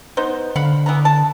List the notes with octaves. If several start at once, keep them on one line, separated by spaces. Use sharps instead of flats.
B3 D#4 C5
D3 F5 F#5 B5
E3 B3 A#5
A5